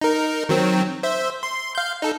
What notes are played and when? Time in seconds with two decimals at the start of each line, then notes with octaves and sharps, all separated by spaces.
0.01 D#4 A#4
0.49 D#3 F#3 C4
1.03 C5 E5
1.43 C6
1.75 F5 G6
2.02 D#4 A4